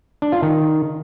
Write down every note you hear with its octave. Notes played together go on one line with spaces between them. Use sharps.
D4
F4
D#3